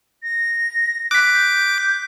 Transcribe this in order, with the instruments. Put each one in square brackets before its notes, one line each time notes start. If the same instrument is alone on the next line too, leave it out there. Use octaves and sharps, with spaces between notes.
[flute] A#6
[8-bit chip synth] D6 [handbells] F#6 B6
[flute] G6